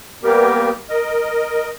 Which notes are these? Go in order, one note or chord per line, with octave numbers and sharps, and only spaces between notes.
G3 A#3 B3 G4 A#4
A#4 D#5